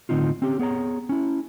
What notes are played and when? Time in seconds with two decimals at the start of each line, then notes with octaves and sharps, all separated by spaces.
0.09 A2 D3 C4 D#4 F4
0.42 C4 C#4 G4
0.59 B3 G#4 C#5 A#5
1.09 C#4 E4